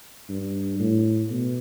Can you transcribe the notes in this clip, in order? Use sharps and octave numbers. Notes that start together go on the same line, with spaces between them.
G2
A2
B2